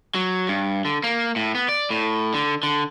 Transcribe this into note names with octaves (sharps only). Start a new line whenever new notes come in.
F#3
G2
D3
A#3
A2
B3
D5
A2
D3
D3